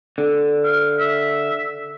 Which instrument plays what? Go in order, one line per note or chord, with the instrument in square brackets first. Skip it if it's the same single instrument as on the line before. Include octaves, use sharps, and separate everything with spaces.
[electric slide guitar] D3
[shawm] F5
E5